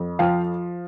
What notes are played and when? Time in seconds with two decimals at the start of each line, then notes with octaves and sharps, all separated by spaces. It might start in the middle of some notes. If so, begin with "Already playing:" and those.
Already playing: F2
0.19 F3 F5 G5